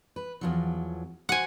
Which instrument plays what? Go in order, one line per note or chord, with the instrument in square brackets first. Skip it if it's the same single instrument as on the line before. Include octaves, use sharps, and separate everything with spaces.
[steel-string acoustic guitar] B4
E2 F3 F#3
[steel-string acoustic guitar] F#4 C5 [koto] F#5 G#5